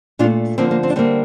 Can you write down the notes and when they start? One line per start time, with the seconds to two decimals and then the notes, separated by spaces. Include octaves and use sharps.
0.19 A#2 D4 F4
0.24 A3
0.58 D3 F3 A#3 C4
0.71 A#3
0.83 C4
0.90 D4
0.96 D3 G3 A#3 C4